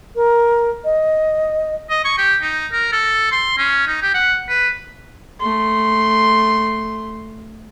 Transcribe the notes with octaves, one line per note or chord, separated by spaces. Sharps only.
A#4
D#5
D#5
C#6
G4
D#4
A#4
A4
C6
C#4
D#4
G4
F#5
B4
A3 C6